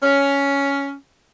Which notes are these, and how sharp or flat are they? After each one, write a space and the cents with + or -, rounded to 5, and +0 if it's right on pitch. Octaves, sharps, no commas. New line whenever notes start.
C#4 +10